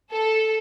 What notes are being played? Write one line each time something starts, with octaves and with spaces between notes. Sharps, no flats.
A4